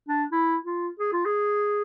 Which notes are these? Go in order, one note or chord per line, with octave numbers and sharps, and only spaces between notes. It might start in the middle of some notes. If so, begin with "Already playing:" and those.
D4
E4
F4
G#4
F4
G#4